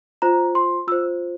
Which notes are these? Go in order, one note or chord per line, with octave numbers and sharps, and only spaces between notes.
F4 C5 A#5
C6
F4 C5 E6